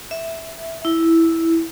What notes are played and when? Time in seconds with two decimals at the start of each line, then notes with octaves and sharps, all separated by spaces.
0.11 E5
0.85 E4